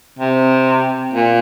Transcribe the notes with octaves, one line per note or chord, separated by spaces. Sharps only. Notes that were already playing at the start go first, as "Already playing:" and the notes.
C3
A#2